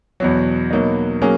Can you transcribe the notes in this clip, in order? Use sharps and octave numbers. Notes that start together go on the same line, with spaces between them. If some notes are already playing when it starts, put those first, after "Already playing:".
E2 B2 F#3
B2 F#3 A#3 D#4
F#3 A#3 C#4 G#4